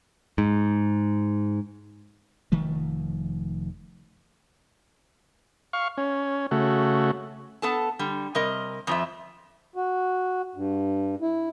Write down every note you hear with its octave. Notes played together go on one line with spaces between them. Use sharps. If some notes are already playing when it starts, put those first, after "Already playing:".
G#2
F1 D#3 F3 A3
F5 C#6
C#4
C#3 A3 F#4
B3 A4 A5
D3 G3
C3 G3 A#4 D#5
F2 F3 E5
F#4
G2
E4